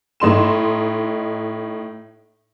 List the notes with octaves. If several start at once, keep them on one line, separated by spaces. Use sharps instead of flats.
A2 D#4 C6 E7